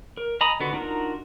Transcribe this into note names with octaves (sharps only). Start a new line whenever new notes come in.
A#4
D#5 G#5 A#5 B5 D#6
D3 B3 F#4
D4 D#4 F4 F#4 A#4